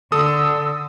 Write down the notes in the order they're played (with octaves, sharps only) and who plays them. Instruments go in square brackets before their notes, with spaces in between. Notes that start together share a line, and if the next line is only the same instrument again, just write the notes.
[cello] D3 [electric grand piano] A4 D#6 [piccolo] E6